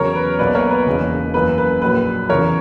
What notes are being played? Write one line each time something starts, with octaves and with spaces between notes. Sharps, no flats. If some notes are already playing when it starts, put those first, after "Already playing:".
Already playing: E2 C#3 F#3 A#4 C#5
B4
B1 B2 A#3 B4 D5
A#4 C#5
B4
E1 E2 C#3 E3 A#3
F#2 E3 A#3 B4
B4
A#1 A#2 F#3 B4
E2 C#3 E3 A#4 C#5